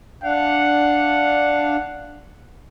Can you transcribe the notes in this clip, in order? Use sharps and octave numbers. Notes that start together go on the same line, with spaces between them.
D4 F5 F#5